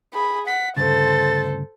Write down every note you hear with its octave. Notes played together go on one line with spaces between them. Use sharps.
G#4 B5
F#5 B6
D2 G2 C#3 A4 C5 A6